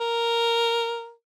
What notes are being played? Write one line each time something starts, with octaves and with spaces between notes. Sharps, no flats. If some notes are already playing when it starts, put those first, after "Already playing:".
A#4